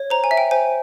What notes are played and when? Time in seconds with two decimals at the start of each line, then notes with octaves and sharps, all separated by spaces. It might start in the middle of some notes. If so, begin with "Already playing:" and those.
Already playing: C#5
0.10 C5 A#5
0.24 G#5
0.31 E5
0.37 G5
0.51 C5 G#5